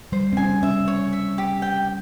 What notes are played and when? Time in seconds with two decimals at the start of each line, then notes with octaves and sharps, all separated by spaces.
0.12 G3 C5
0.33 C4
0.37 C#4 G#5
0.63 C#4 E5
0.88 C#5
1.13 E5
1.38 G4
1.62 G5